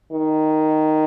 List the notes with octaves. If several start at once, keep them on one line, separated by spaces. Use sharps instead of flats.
D#3